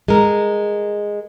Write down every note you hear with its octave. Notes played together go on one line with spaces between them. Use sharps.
G#3 A#4